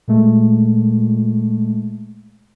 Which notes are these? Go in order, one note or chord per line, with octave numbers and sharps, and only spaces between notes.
A#2 G#3 A3